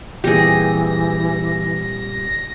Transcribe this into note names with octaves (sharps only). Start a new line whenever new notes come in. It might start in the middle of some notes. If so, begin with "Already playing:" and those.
A#2 E3 G3 C4 G4 G#4 A#6